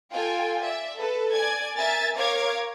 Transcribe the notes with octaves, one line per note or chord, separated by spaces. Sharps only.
F4 A4 G5 G#5
D5 E5
A4 B4
D5 G#5 G#6
A#4 E5 G#5 A6
A#4 C#5 F5 D6 G#6